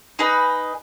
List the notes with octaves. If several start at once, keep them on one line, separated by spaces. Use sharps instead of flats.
D#4 G#4 B4 D#5